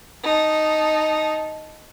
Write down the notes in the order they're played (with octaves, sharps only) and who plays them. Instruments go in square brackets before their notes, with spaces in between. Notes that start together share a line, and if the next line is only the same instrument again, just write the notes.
[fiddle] D#4 A5